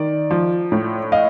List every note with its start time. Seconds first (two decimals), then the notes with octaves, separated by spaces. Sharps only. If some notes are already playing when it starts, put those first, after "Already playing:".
Already playing: D#3 D5
0.31 F3
0.72 A2
1.12 D#5 F5